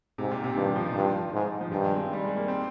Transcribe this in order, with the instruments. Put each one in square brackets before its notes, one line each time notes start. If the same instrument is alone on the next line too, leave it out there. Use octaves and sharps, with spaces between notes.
[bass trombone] G#2 [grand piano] C3
[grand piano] A#2
C3
[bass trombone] G2 [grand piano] D#3
[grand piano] F3
D#3
[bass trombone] G2 [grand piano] F3
[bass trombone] G#2
[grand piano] F3
[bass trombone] G2 [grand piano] D#3
[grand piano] G#3
C4
G3
G#3
A#3
C4